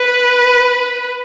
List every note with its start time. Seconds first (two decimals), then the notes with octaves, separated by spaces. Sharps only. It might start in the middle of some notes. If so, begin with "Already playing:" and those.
Already playing: B4